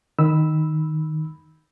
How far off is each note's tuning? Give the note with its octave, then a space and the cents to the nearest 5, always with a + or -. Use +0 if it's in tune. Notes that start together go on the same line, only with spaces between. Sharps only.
D#3 +0 B5 +0 E6 -10